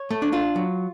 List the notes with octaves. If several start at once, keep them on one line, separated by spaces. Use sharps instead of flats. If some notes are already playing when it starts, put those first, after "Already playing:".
Already playing: C#5
A3
D4
D4 F4
F#3